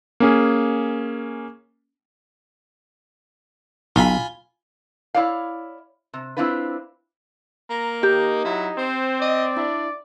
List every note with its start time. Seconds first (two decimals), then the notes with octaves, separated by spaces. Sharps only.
0.20 A#3 C#4 G#4
3.96 B1 F4 G#5 B5
5.14 E4 C#5 D5 F5
6.13 C3
6.37 C4 D4 E4 F4 B4
7.70 A#3 A#5
8.03 D#2 D#4 G4
8.45 F#3 E4
8.78 C4 C5
9.21 D5 D#5
9.57 D4 E4